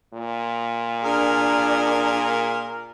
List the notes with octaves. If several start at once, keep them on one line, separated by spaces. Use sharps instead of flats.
A#2
D4 G#4 A#4